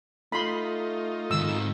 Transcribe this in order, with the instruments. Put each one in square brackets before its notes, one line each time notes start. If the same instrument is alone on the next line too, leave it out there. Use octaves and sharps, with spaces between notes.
[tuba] A3 [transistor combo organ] D#4 F4 [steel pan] B5 C6
[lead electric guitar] G#2 D#3 [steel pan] E6